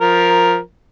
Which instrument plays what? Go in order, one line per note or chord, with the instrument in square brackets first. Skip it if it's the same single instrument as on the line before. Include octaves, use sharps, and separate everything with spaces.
[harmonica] F3 A#4